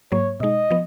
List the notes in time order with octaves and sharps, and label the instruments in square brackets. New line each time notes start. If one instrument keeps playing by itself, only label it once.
[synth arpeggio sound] G#2 F#3 A#3 [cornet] C#5
[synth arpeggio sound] B2 G#3 D#4 [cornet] D#5
[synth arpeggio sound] F3 B3